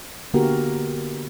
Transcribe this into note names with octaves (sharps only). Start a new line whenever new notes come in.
D3 A#3 B3 F#4 G4 A#4